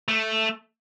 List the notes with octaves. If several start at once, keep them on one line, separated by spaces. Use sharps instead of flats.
A3